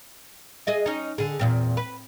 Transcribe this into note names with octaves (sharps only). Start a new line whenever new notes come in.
G#4 D#5 E5
C#4 D#4
D3 G#4
E2 A#2 C4
B4